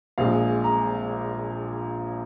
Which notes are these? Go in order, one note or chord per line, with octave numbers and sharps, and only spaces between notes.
A#1 A#2 G#3 F5
A#5